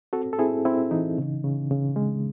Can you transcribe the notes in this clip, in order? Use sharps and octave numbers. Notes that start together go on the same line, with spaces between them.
C4 F#4 A4
A4
C4 E4 G#4
C4 E4
E3 D#4
C#3
C#3
C#3
G#3